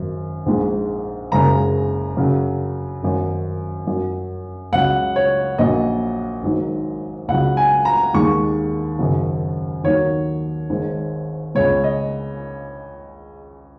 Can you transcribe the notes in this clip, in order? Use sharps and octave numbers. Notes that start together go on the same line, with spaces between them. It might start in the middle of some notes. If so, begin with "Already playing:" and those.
Already playing: G#1 F#2 F#3
A#1 G#2 G#3
F#1 F#2 C#3 G#3 A#5
F#2 C#3 F#3
G#1 F#2 F#3
F#2 F#3
C#2 C#3 F#3 F#5
C#5
A#1 A#2 F#3 D#5
G#1 G#2 D#3 F#3
C#2 C#3 F#3 F#5
G#5
A#5
D#2 D#3 G#3 C#6
G#1 F#2 C#3 F#3
D#2 D#3 F#3 C#5
G#1 G#2 G#3
C#2 C#3 G#3 C#5
D#5